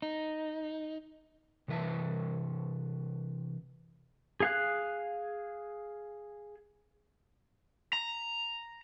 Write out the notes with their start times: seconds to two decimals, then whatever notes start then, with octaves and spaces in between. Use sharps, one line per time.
0.02 D#4
1.68 C3 E3 B4 E5 A5
4.40 G#4 F5 F#6
7.93 A#5